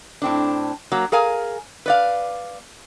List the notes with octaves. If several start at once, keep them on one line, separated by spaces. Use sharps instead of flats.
A2 C4 D4
F#3 A#3
G#4 A#4 F5 G#5
B4 D5 F5